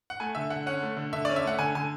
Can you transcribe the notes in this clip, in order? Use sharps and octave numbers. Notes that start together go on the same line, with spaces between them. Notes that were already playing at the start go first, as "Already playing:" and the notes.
F#5
A3 G#5
D3 E5
D3 F#5
C#4 F#5
A3
D3
D3 E5
C#4 D5
E5
A3 F#5
D3 G#5
D3 G#5